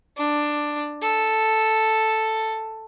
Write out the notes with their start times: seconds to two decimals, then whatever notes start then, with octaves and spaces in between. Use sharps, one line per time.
0.17 D4
1.02 A4